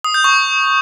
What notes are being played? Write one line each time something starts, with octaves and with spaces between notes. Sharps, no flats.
D#6
G6
C#6